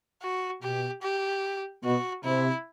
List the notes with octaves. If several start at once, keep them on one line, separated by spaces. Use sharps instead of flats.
F#4
B2 G4
G4
B2 F#4
C3 E4